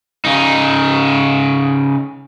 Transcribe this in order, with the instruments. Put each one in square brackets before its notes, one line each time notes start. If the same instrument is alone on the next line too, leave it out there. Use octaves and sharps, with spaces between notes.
[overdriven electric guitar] C#3 D#4